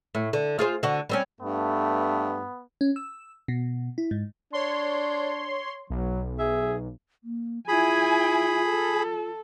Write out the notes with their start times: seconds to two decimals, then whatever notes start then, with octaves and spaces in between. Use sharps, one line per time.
0.15 A2
0.33 D3
0.59 F4 G#4 C5
0.83 D3 F#4
1.09 G3 C4 C#4
1.41 G2 A3 B3
2.81 C#4
2.96 E6
3.48 B2
3.98 E4
4.11 G#2
4.53 D4 C#5 C6
5.90 B1 F#3
6.39 G#4 E5
7.24 A#3
7.68 E4 F4 G#4 G#5 B5
8.66 A4